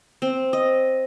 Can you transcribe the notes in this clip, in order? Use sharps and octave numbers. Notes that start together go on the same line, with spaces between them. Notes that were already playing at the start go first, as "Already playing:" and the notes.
C4
D#5